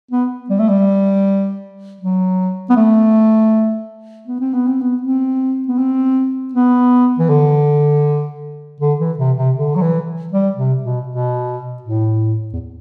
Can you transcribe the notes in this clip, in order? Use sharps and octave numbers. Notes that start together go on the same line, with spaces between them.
B3
G3
A3
G3
F#3
B3
A3
B3
C4
B3
C4
B3
C4
B3
C4
B3
E3
D3
D3
E3
C3
C3
D3
F#3
E3
G3
C3
B2
B2
A2
E2